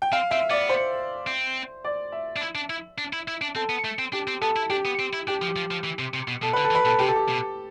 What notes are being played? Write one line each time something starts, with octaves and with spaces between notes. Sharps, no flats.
G5
C4 F5
C4 E5
B3 D5
C5
C4
D5
E5
D4
E4
D4
E4
D4
E4
E4
D4
C4 A4
B3
A3
C4
D4 G4
C4
B3 A4
E4
D4 G4
B3
C4
E4
D4 G4
F3
G4
F3
F3
E3
C3
C3
B2
B2 A4
D3 B4
A4
E3
B4
B2 A4
C3 G4
A4
G4
B2